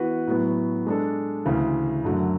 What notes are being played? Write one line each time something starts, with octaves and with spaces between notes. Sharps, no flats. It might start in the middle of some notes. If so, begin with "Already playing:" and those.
Already playing: E3 B3 F#4 B4
A2 F#3 B3
G#3 D4 A4
D2 C#3 E3
F#2 D3 F#3 A3